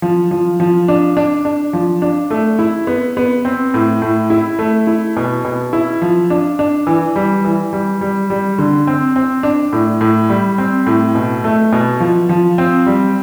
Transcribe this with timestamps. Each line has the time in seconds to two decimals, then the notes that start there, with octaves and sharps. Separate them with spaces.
0.02 F3
0.31 F3
0.60 F3
0.88 D4
1.17 D4
1.45 D4
1.73 F3
2.02 D4
2.31 A3
2.59 E4
2.87 B3
3.17 B3
3.45 C4
3.74 A2
4.02 A2
4.30 E4
4.59 A3
4.87 E4
5.17 B2
5.45 B2
5.73 E4
6.02 F3
6.30 D4
6.59 D4
6.87 E3
7.16 G3
7.45 E3
7.73 G3
8.01 G3
8.30 G3
8.59 D3
8.87 C4
9.16 C4
9.43 D4
9.73 A2
10.01 A2
10.29 G3
10.58 C4
10.87 A2
11.15 B2
11.44 A3
11.73 B2
12.00 F3
12.29 F3
12.58 C4
12.86 G3